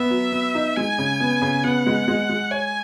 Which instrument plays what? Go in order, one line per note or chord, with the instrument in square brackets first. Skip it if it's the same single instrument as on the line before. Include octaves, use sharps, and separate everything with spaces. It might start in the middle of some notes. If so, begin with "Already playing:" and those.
Already playing: [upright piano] B3 [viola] E5
[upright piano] F#3
B3
D#4
[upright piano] G#3 [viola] G#5
[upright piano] C#3
B3
C#3
[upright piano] B3 [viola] F#5
[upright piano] G#3
G#3
G#3
[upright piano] C#5 [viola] G#5